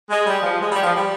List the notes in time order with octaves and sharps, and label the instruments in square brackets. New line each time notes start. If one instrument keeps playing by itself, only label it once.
[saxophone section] G#3
G3
F3
G#3
G3
F3
G3